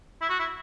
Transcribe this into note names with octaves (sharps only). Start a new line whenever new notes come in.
E4
F#4
E4